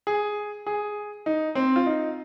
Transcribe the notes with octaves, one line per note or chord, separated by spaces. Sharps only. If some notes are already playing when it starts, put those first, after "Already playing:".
G#4
G#4
D#4
C4
F4
D#4